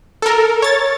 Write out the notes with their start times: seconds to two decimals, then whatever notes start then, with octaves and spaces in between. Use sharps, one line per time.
0.22 A4 A#4
0.62 C#5 A6